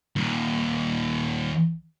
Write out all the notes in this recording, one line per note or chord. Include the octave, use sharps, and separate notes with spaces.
D#2 A#2